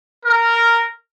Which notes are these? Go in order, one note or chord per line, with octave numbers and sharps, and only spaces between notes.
A#4